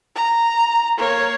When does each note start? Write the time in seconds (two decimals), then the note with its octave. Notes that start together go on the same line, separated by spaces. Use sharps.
0.16 A#5
0.98 A#3 C#5